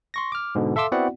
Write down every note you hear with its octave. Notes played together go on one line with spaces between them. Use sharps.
C6 C#6 A#6
D6 F6
G#2 B2 D3
A4 E5 F5 C6 D6 E6
B3 C4 E4 F#4 D5 F#5